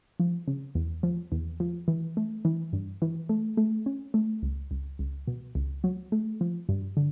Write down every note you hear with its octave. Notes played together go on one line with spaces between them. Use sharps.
F3
C#3
E2
F3
E2
F3
E3
A3
E3
G2
E3
A3
A3
C#4
A3
C#2
C#2
C#2
B2
C#2
F#3
A3
F3
G2
D3